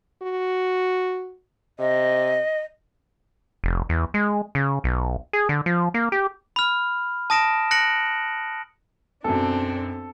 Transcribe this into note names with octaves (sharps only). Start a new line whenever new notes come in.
F#4
C3 D#5
F1
E2
G#3
C#3
B1
G#4
D3
F3
A#3
G4
B5 F6
A5 D#6 A#6 D7 E7
F#6 A#6 C#7 D7 F#7
B1 F#2 C4 D4 A4